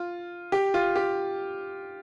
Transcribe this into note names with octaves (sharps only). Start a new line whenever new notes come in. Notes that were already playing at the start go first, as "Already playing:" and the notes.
Already playing: F4
G4
F4
G4